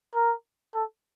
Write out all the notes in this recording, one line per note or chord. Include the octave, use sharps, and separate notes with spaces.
A#4
A4